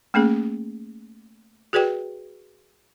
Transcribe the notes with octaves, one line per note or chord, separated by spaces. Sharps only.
A3 A#3 C#4 G#4
F#4 G#4 B4 D5 G5